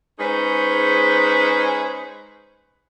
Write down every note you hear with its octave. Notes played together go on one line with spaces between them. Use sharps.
G#3 C#4 D#4 G#4 B4 C5